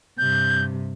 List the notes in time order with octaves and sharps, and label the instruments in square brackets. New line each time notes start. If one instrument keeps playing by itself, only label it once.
[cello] G2 C3 [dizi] G6